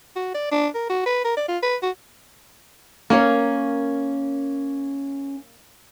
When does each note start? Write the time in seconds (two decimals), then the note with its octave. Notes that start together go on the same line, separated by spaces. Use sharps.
0.16 F#4
0.34 D5
0.51 D4
0.75 A#4
0.89 F#4
1.06 B4
1.24 A#4
1.37 D5
1.48 F4
1.63 B4
1.82 F#4
3.10 A#3 C#4 A#4 C#5